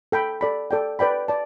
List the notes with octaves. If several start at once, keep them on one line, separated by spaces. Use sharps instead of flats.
A4 G5 B5
A4 D5 B5
A4 D5 G5
B4 D5 G5 B5
D5 A5